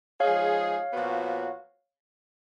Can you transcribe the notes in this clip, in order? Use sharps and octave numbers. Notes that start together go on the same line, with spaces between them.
F3 G#3 D#4 G#4 C#5 F5
A#2 F3 B3 F#4